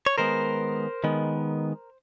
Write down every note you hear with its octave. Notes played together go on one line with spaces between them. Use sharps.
C#5
D#3 G#3 B3 A#4 C5
D#3 G#3 B3